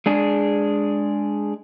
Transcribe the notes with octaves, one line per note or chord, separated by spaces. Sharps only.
G#3 D4 G#4